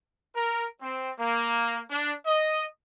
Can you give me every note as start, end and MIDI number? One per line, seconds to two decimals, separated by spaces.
0.35 0.66 70
0.81 1.12 60
1.18 1.80 58
1.90 2.12 62
2.26 2.65 75